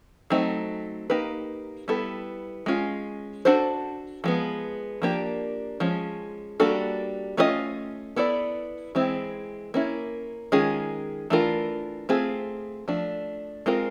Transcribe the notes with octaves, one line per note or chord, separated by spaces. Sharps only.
F#3 A3 C4 D#4
A#3 D#4 G4 B4
G3 B3 E4 A4
G#3 C#4 F4
D4 F#4 A4 C5
F3 G#3 B3
F3 A#3 D4 G4
F3 G#3 C#4
G3 A#3 D4 F#4 A4
A3 C#4 F4 A#4 D#5
B3 E4 A4 D5
E3 G#3 C4 E4
A#3 C#4 E4
D#3 G#3 C#4 F4 G#4
E3 A3 D4 F4 A#4
A3 C4 F4 G#4
F3 A3 D4
G#3 C4 F4 A#4